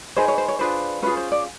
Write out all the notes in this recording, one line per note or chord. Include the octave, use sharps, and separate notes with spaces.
D#4 G#4 B4 C5
C#5
C5
C#5
D4 F4 G#4 B4 C5
C#4 F4 G#4 B4
C5
D5